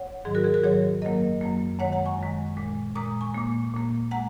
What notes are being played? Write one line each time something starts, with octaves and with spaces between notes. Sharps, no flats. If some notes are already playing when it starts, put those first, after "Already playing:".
Already playing: C#5 F#5
G#2 D#3 F#3 G#4
F#4 A#4
G#4
F#4 A#4
G#2 D#3 F#3 G#4 C#5
F#2 F#3 A#3 A#4 D#5
F#2 F#3 A#3
F#2 D#3 G#3 C#5 F#5
F#5 A#5
G#5 C#6
F#2 D#3 G#3
A#2 G#3
A#2 G#3 A#5 D#6
G#5 C#6
A#2 A#3
A#2 A#3
G#3 F#5 A#5